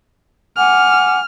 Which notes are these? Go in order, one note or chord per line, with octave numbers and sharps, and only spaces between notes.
F#5 G#5 D6 F6